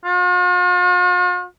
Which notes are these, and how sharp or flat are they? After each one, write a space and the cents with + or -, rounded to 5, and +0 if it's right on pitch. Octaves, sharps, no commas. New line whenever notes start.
F4 +45